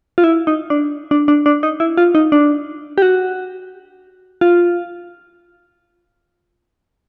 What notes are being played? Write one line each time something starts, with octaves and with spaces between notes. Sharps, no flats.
F4
E4
D#4
D4
D4
D4
D4
D#4
E4
F4
D#4
D4
G4
F#4
F4